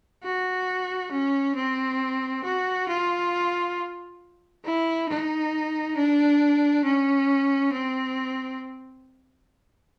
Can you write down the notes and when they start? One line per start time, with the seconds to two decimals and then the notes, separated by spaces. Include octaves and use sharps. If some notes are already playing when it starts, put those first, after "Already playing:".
0.23 F#4
1.11 C#4
1.55 C4
2.44 F#4
2.88 F4
4.65 E4
5.09 D#4
5.97 D4
6.85 C#4
7.73 C4